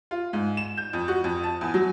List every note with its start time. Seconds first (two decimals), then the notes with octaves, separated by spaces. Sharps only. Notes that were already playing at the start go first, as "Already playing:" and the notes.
0.11 F4
0.33 G#2
0.57 E7
0.77 G6
0.93 F2
1.08 F#4
1.24 F2
1.43 A5
1.61 E2
1.74 F#3